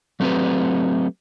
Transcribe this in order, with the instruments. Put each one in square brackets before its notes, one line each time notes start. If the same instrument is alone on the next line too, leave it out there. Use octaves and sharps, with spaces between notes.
[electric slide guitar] F#3 A3 C4 F#4 G4 B4